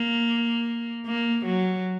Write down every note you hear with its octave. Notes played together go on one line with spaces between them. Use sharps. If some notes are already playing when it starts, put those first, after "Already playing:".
Already playing: A#3
A#3
F#3